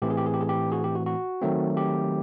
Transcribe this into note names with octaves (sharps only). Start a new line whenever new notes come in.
A2 E3 A3 C4 G4
G#4
G4
G#4
G4
G#4
G4
F#4 G#4
G4
F#4
F#4
D#3 F#3 A3 C4
G4